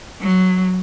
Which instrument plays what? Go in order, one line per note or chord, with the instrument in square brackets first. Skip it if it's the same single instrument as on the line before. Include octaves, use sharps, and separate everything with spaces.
[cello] F#3